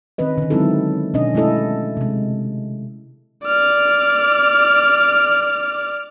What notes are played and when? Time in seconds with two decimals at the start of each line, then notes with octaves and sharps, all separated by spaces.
0.18 D#3 C4 C#4 B4 D#5
0.38 D3 D#3
0.50 F#3 G#3 C4 D#4 E4 A4
1.14 B2 D#3 C#4 D4 D#5
1.34 G#3 A3 E4 A4 D#5
1.97 C3 G#3
3.45 D5 F6